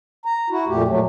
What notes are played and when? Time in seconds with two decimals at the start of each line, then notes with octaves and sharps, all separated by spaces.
0.25 A#5
0.50 E4 F#4
0.67 F2 A#2 A3 G4
0.88 A#2 F#3 A3